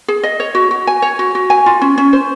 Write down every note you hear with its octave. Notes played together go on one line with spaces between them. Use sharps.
G#4
D#5
C#5
F#4
F#4
G#5
C#5
F#4
F#4
G#5
F4
C#4
C#4
C5